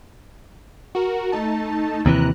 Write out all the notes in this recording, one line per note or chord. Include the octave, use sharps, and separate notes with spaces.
F#4 A#4
A3 D#4 A5
D#2 C3 E3 A#5 F#6